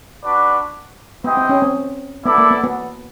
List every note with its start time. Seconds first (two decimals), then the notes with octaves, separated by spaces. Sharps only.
0.23 D4 F#4 B4 D5
1.24 B3 E4 G4 C5 D#5 G5
1.37 C4
1.49 C#4
1.62 C4
2.25 B3 E4 A4 D5
2.38 A#3
2.51 B3
2.64 B3